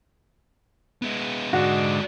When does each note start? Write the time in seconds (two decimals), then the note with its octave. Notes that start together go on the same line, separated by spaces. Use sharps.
1.02 G#3 B3
1.53 G#2 D3 G#3 D4 F#4